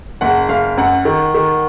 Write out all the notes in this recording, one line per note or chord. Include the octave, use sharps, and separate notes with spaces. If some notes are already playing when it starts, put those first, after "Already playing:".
F#1 F#5
F#1 F5
F#2 F#5
D#3
D#3